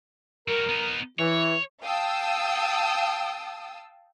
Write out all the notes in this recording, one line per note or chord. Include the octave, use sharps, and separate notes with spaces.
G3 F#4 A#4
B3 D#4
E3 C#5
F5 G5 A5 D#6 E6